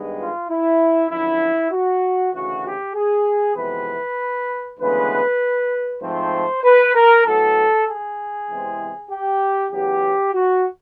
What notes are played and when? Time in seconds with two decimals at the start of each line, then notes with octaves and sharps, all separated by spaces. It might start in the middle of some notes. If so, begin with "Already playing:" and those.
Already playing: G2 D#3 G#3 B3
0.18 F4
0.49 E4
1.10 F#2 D3 F3 E4
1.71 F#4
2.33 D2 C#3 E3 F#4
2.64 G4
2.94 G#4
3.56 F2 C3 E3 G#3 B3 B4
4.79 D2 C#3 E3 G#3 B3 B4
6.01 G#2 F3 A3 C4 C5
6.64 B4
6.94 A#4
7.25 A2 F#3 B3 A4
7.86 G#4
8.48 E2 C3 E3 G#3 C4
9.10 G4
9.71 E2 C#3 F#3 B3 G4
10.33 F#4